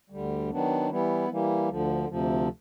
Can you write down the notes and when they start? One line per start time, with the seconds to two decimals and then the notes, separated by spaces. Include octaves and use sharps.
0.10 D2 D3 G3
0.50 D#3 F#3 B3 D4
0.90 E3 G3 B3 E4
1.29 E3 G3 A#3
1.69 D2 D3 F3
2.08 D2 C3 F3